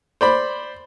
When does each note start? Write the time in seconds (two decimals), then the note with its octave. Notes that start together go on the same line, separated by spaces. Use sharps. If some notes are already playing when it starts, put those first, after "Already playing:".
0.21 C5 D5 B5